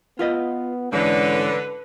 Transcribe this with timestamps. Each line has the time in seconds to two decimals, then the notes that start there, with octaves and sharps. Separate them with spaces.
0.19 B3 F4 B4 D#5
0.93 G#2 D3 E3 C#4 B4